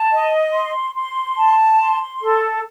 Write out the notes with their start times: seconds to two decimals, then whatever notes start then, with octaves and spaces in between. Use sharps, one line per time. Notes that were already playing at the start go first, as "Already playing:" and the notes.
Already playing: A5
0.11 D#5
0.54 C6
0.95 C6
1.38 A5
1.80 C6
2.22 A4